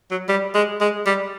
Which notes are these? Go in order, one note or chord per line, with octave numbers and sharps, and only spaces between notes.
F#3
G3
G#3
G#3
G3